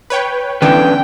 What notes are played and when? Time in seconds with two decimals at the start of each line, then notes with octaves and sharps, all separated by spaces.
0.10 B4 C#5 G5
0.62 D3 E3 B3 C#4 D4 B4 G5